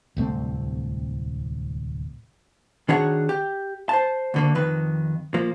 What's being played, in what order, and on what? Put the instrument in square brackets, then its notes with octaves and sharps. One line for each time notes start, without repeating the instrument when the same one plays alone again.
[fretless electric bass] D1 C2 A3 C4
[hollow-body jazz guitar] D#3 D4 F#4 G#4 C#5 F#5
G4
C5 A5
D2 D3 A#3
F2 D#3 B4
F3 A#3